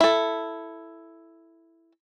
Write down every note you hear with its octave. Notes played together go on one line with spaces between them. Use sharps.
E4 A4